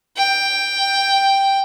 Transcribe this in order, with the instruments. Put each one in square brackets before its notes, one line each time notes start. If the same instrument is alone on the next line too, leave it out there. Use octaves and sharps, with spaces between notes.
[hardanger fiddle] G5